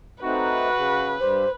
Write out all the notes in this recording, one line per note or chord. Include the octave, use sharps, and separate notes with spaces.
A3 C4 D#4 F#4 B4
C#3
G2 G3 G4 C5